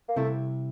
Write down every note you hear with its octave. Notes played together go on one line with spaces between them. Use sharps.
A#3
C3 G3 A3 C4 E4